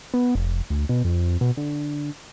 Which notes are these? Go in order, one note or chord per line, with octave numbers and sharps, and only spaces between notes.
B3
F1
D2
B2
F2
B2
D3